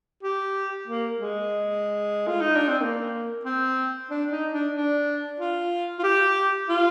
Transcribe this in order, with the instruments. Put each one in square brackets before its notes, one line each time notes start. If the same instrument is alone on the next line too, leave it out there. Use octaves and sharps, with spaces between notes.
[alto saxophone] G4
A#3
G#3
F4
D#4
D4
C4
A#3
C4
D4
D#4
D4
D4
F4
F4
G4
F4